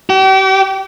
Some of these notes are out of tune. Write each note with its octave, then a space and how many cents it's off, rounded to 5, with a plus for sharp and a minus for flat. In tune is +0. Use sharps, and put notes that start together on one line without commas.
G4 -40